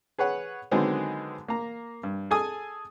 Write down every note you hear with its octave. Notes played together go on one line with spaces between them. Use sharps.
G#4 B4 C#5 F#5
D3 D#3 F#3 G#3 B3 C4
A#3 A#5
G2
G#4 A4 G#5 D#6